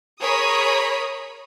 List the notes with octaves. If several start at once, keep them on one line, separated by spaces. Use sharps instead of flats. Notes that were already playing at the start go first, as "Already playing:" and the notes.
G#4 A#4 C#5 B5 D#6